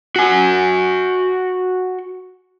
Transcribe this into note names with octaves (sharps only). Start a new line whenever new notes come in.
F#4 G#5